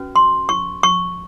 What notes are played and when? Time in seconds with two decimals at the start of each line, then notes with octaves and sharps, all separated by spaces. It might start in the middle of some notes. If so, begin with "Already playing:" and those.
Already playing: C#4 F#4 B4
0.16 C6
0.49 C#6
0.83 C#6